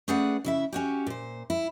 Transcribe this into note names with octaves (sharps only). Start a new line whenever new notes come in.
A3 C#4 G#4 B4 D5 F#5
C#3 E4 E5
C#4 F#4 G4
A#2 C5
E4